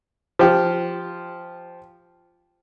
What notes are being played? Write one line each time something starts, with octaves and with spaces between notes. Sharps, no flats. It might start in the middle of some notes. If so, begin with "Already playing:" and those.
F3 G4